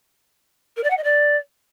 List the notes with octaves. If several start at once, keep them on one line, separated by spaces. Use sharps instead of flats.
A#4
D5
F#5
D#5
D5